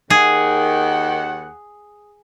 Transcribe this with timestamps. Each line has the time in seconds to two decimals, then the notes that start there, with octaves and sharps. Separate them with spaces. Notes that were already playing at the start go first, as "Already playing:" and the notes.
0.10 D#2 D#3 G#4 F#5